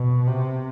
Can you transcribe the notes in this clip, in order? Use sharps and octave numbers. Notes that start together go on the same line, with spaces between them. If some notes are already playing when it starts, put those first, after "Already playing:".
Already playing: B2
C3